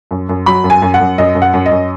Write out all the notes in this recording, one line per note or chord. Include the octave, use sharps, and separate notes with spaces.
F#2
F#2
F#3 B5
F#2
G#5
F#2
F#5
F#2
F#2 D#5
F#2
F#5
F#2
D#5
F#2